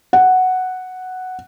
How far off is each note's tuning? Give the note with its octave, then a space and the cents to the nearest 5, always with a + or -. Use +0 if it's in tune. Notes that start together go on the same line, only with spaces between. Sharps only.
F#5 +0